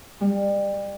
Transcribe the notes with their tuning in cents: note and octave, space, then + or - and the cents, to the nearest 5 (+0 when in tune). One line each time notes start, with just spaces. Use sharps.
G3 +30